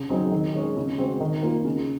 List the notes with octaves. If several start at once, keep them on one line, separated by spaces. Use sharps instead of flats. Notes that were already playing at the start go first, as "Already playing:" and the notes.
Already playing: C#3
F#3 C4 D#4 G#4
D#3
G#3 C#4 G#4
C#3
G#3 C4 F#4
D#3
A#3 F4
C#3